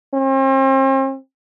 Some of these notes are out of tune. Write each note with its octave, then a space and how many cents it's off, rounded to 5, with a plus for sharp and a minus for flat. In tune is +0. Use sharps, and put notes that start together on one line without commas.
C4 +40